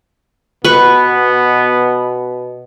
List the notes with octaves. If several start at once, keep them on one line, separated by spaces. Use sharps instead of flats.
B2 B3 B4 C#6